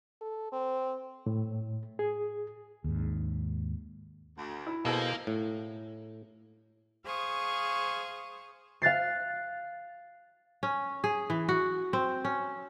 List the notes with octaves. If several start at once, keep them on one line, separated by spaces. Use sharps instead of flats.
A4
C4
A2
G#4
D#2 G#2
D2
E4
B2 F3 A#3 G#4 A4
A2
G#4 C5 F5 C#6 D#6
F5 F#6 A6 C7
C#4
G#4
E3
F#4
C4
C#4